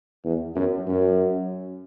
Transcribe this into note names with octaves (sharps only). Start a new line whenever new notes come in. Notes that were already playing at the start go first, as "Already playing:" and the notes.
E2
F#2
F#2